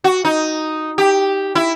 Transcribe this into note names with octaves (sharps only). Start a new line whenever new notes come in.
F#4
D#4
G4
E4